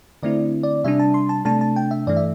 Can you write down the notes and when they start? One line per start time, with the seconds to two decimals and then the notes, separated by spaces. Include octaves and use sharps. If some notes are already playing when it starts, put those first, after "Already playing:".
0.23 D3 A3 C4 E4 D5
0.63 D5
0.84 C3 G3 D4 E5
1.00 A5
1.14 C6
1.29 A5
1.45 C3 A3 D4 A5
1.61 A5
1.76 G5
1.91 E5
2.07 G2 E3 A3 D5
2.17 E5